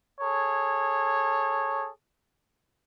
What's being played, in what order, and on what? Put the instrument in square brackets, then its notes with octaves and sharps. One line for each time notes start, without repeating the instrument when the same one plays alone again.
[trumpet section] G#4 A4 C#5